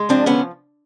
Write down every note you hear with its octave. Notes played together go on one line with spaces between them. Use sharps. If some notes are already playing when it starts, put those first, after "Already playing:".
Already playing: G#3
F3 C4 D4
D3 B3 C#4